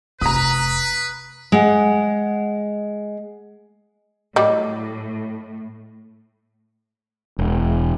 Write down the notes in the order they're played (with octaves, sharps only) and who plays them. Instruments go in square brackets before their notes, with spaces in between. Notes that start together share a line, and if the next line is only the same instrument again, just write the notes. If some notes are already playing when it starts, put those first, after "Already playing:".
[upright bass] F1 [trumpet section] B4 [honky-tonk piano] A#5 D#6
[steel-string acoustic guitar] G#3 F#5
[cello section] A2 [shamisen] F#3 G3 [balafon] D#5 D6
[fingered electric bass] E1